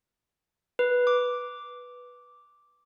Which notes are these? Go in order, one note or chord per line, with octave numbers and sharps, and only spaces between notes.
B4
D6